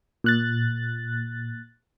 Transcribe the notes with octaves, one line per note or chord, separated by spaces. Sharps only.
A#2 F#6 A6